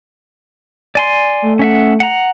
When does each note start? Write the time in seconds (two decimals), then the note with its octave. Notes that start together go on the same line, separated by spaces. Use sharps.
0.95 D5 G#5 C6
1.42 A3
1.59 C#4 E5 F#5
2.00 F#5 A#5